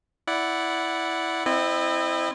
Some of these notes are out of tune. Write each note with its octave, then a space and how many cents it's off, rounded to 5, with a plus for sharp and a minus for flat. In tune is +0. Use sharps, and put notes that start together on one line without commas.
E4 +0 D5 -10 F#5 +0
C4 +0 E4 +0 D#5 -35